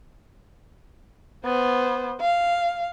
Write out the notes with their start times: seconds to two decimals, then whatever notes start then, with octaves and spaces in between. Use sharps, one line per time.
1.45 B3 C5
2.21 F5